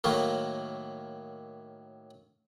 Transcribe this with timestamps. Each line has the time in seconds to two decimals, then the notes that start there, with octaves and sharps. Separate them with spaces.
0.04 A2 D#3 F#3 A#3